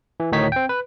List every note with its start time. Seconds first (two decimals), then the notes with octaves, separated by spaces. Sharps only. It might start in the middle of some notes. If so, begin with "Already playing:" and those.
0.20 E3
0.32 D2 A2 D#3 D#4 C#5 B6
0.52 C4 G5
0.69 B4